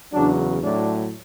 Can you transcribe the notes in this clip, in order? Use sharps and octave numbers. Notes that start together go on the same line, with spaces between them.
E2 C#3 F#3 D4
A2 F#3 D4